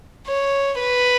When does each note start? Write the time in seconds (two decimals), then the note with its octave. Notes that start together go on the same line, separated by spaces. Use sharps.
0.27 C#5
0.80 B4